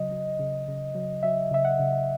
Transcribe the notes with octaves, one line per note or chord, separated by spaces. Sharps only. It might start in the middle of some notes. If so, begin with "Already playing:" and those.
Already playing: C#3 F#3 D#5
F#3
C#3
C#3
F#3
F#3 E5
C#3 E5
F#5
C#3